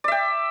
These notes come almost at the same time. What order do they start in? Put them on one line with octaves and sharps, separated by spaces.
D5 E5 G5